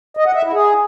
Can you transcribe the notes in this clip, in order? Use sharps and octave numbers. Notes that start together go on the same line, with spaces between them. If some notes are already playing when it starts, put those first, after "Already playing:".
D#5
F#5
E5
E4
G#4